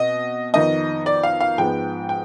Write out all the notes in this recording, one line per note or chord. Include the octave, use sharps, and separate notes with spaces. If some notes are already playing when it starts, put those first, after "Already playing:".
Already playing: B2 C4 D#5
F2 D#3 B3 D#5
D5
F5
F5
G#2 F3 G#3 B3 G5
G5